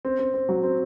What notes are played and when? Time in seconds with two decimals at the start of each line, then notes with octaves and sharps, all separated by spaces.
0.05 C4
0.19 C4
0.34 C4
0.49 F#3
0.63 C4